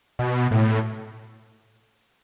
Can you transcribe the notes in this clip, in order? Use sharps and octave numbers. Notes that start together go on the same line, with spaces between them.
B2
A2